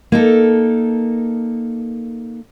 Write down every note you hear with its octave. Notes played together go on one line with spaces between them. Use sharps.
A#3 D#4 A4